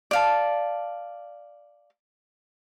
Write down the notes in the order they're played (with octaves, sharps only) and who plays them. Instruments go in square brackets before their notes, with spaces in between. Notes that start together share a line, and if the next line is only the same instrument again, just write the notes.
[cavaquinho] D5 F5 A5